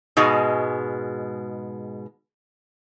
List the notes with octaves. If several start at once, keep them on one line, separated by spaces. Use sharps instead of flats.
G#2 B2 G#3